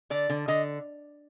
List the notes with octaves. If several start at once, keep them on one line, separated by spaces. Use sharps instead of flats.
D3 D5
D3
D3 D#5